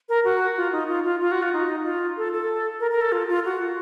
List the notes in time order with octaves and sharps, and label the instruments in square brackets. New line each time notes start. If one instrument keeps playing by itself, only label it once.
[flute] A#4
F#4
F4
D#4
F4
F4
F4
F#4
F4
D#4
F4
A4
A4
A#4
A#4
A4
F4
F4
F#4